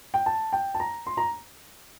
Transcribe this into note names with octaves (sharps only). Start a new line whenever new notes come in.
G5
A5
G5
A5
A#5
C6
A#5